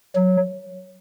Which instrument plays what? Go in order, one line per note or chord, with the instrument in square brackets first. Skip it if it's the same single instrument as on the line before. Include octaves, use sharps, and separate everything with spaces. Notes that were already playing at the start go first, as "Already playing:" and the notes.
[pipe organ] F#3